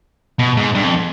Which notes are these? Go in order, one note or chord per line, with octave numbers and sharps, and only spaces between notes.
B2
G#2
G2
F2